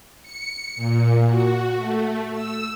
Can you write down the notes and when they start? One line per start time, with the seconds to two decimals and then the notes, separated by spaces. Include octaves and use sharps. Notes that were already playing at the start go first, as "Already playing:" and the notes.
0.22 C#7
0.76 A#2
1.27 F#4
1.76 A3
2.32 E6